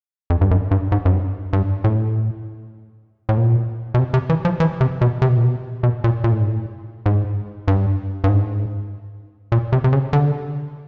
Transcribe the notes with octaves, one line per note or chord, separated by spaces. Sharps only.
F2
G2
F#2
G2
G#2
F#2
G2
G2
A2
A2
A#2
B2
C3
C3
E3
F3
E3
C3
B2
C3
B2
A#2
B2
B2
A#2
A#2
A2
G#2
A2
G#2
G2
G2
G#2
A#2
C3
C3
C#3
D3